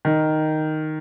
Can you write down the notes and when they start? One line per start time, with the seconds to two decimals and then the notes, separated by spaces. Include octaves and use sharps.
0.05 D#3